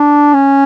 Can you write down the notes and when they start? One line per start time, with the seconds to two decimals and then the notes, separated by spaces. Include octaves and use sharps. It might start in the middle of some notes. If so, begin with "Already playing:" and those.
Already playing: D4
0.34 C#4